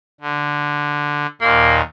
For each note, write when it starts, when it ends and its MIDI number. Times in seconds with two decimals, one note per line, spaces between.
0.21 1.26 50
1.41 1.81 39
1.41 1.81 46
1.41 1.80 58